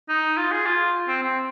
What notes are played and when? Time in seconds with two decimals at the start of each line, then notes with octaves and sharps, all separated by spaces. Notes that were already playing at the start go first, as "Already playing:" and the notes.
0.09 D#4
0.37 F4
0.52 G#4
0.66 F4
1.08 C4
1.23 C4